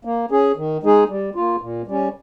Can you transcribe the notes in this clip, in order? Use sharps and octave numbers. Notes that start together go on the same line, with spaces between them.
A#3
C#4 G#4
D#3
G#3 D#4 G#4
G3
A#3 F4
A#2
G3 C#4